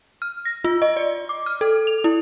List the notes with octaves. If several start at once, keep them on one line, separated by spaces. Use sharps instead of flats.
F6
A#6
F4
D#5
D5
D6
F6
A4
F7
E4